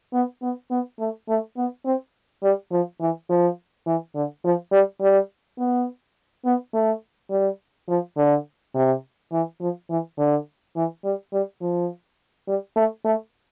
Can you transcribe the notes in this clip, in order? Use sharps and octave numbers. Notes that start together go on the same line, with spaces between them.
B3
B3
B3
A3
A3
B3
C4
G3
F3
E3
F3
E3
D3
F3
G3
G3
B3
B3
A3
G3
F3
D3
C3
E3
F3
E3
D3
E3
G3
G3
F3
G3
A3
A3